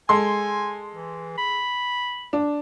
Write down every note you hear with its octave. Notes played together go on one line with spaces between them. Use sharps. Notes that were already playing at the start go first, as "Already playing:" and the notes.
G#3 A4 G#5 C6
E3
B5
D4